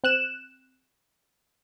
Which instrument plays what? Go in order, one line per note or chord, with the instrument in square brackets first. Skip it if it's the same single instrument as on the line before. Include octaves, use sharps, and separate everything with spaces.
[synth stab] C4 F#6 E7